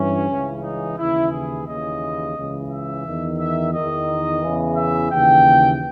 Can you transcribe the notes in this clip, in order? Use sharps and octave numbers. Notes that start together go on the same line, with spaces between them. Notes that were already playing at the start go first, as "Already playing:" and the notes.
Already playing: G2 E3 C#4
C#2 C#3 E3
D#4
D#2 C#3 E3 E4
G#4
D#2 C#3 E3 D#5
C#2 C#3 E3
E5
E2 D#3
E5
E2 D#3 D#5
E2 C#3 E3
E5
D#2 C#3 E3 G5